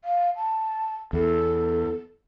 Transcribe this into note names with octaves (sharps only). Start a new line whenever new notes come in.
F5
A5
E2 A4